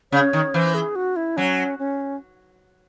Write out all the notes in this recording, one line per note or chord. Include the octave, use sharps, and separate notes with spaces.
C#3 C#5
D#3
E3 C5
G#4
F#4
E4
F#3 C#4
C#4